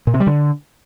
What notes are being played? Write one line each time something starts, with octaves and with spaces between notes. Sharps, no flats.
A#2
C3
G3
D3